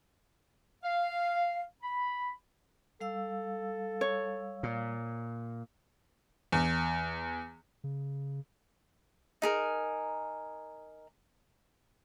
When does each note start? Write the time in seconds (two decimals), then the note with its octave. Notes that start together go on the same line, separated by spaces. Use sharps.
0.83 F5
1.83 B5
3.01 G3 A4 F5 E6
4.01 C#5
4.63 A#2
6.52 E2
7.84 C#3
9.42 D#4 G#4 A#4